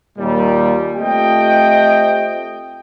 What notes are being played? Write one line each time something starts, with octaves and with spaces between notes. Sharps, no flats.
D#2 A#2 G3
A3 C4 F4 G4 D#5 G5